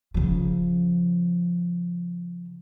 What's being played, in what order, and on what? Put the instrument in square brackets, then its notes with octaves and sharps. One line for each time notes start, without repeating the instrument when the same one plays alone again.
[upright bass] C#3 F3